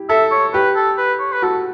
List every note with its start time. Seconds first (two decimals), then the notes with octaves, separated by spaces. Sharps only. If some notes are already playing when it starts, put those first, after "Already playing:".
Already playing: E4 G4
0.09 A4 E5
0.31 C#5
0.54 G4 B4
0.76 A4
0.97 B4
1.20 C#5
1.33 B4
1.42 F#4 A4